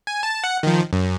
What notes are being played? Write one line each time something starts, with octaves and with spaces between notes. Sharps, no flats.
G#5
A5
F#5
D#3 F3
F#2